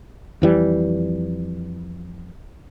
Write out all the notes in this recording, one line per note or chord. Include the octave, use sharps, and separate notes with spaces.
F2 E3 G3